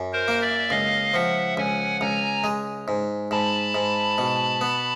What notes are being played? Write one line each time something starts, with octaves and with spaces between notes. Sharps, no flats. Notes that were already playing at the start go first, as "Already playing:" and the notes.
Already playing: F#2
A#4 C5
A#3
D5 E5
C#2 D#5 F5
F3 E5 F#5
C#2 F#5 G#5
C#2 G#5 A#5
G#3
G#2
G#2 A5 B5
G#2
B2
B3